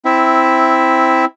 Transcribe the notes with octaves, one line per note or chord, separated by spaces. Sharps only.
C4 E4 E5